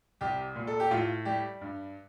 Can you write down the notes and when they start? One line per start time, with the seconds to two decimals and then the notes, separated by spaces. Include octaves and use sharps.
0.21 C2 G4
0.56 A#2
0.67 A4
0.80 G4
0.91 A2 F4
1.25 G3 G4
1.61 G2